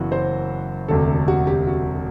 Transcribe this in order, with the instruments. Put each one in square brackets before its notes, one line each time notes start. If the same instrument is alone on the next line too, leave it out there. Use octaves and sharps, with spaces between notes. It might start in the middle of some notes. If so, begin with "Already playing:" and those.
Already playing: [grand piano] F#1 F#2 E3 B3 F#4
[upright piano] C5
[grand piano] E1 D2 C3 [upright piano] A4
[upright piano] F#4
G4
F#4